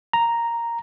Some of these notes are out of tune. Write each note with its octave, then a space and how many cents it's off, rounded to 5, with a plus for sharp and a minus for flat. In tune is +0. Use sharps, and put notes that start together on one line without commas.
A#5 +0